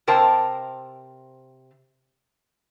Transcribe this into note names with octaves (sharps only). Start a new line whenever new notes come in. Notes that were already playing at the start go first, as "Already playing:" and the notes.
C3 A#4 C5 G5 A5